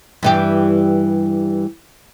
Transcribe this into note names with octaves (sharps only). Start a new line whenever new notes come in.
G2 E3 G4